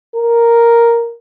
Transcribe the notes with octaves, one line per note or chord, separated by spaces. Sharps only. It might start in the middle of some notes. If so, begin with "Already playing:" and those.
A#4